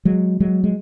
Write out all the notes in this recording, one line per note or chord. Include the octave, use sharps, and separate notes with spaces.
F#3 G#3
F#3 G#3
G#3